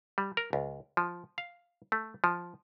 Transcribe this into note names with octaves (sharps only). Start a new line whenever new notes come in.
G3
A#4
C#2
F3
F5
A3
F3